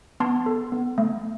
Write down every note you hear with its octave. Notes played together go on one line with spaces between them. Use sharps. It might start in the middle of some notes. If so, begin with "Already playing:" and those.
B3 A5 C6
A4
B3
A3